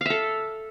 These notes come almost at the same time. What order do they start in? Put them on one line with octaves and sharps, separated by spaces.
F5 E5 A4